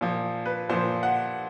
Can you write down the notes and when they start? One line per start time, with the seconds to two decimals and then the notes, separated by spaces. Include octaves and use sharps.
0.01 A#2 F3
0.46 B4
0.69 A#2 F3 C5
1.03 F#5